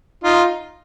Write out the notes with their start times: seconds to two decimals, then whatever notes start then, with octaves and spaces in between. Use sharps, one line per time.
0.24 D#4 F4